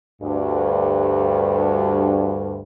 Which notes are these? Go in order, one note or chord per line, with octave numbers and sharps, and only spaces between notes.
D2 G2